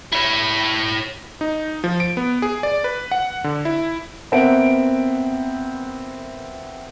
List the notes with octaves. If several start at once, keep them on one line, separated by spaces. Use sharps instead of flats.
E4 C#5 B5
D#4
F3
D7
B3
G#4
D5
B4
F#5
D3
E4
B3 C4 A#4 E5 F#5 D7